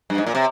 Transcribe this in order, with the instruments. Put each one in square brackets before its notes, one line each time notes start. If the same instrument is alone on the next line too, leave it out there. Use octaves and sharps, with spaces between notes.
[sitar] G2
G#2
A#2
C3